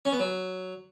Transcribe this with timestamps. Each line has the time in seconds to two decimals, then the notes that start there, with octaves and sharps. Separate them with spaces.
0.05 C#4
0.12 B3
0.20 F#3